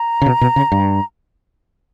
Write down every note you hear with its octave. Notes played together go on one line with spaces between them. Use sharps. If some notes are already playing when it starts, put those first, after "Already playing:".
Already playing: A#5
C#3
B2
B2
C#3
G2